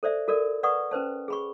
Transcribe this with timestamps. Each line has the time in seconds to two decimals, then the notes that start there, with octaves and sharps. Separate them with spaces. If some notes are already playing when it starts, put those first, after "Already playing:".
0.03 A4 C5 D5 E5
0.28 F#4 A4 A#4 D5
0.63 B4 D5 F#5 C#6 D#6
0.91 C#4 B4 C5 A5
1.28 G#4 B5 C#6